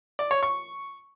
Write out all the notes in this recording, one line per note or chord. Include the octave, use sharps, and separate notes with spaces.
D5
C#5
C#6